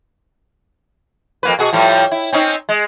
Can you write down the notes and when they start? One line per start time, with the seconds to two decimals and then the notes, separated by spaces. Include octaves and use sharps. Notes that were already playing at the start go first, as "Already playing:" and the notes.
1.43 F2 A#3 B4
1.59 B2 F#4 G#4
1.73 A2 F3 G3
2.11 E4
2.33 C4 C#4 D#4
2.69 G#3